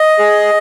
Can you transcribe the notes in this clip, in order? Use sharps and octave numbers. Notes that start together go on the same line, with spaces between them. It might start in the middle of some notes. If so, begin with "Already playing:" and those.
Already playing: D#5
G#4